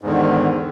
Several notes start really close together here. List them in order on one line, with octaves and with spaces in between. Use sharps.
G#2 E2 D3 D#3